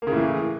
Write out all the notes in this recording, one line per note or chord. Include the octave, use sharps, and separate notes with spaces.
A2 C#3 E3 A#3